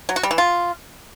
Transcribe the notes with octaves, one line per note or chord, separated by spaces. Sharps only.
F#3
F#4
G3
E3
F4